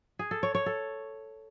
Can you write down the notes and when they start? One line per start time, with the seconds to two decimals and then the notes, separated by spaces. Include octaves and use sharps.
0.19 G#4
0.31 A4
0.43 C#5
0.55 C#5
0.66 A4